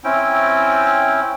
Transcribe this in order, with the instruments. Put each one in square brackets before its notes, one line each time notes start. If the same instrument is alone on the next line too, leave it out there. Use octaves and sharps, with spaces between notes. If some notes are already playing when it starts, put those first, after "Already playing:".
[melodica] C4 C#4 E4 G5